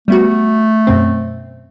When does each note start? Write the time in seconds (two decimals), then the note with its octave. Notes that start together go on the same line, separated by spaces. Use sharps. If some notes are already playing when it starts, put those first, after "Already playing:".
0.08 G3 A3 B3 F#4
0.87 F#2 B2 C4